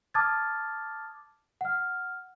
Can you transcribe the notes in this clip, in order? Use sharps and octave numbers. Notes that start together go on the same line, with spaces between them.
A5 D6 D#6 F6 G#6 A6
F#5 F6